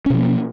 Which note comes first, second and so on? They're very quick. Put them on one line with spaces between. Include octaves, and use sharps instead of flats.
C#4 B2 F3 A#3